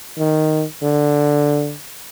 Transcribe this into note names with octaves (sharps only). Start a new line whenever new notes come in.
D#3
D3